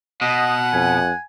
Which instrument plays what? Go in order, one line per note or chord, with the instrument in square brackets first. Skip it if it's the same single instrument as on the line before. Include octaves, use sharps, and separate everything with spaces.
[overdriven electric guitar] B2 [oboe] D#5 [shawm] F#5
[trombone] F2 [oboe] G#5